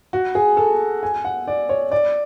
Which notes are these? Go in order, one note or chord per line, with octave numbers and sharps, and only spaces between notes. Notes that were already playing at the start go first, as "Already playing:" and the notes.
F#4
G#4
A4
G#5
F#5
D5
C#5
D5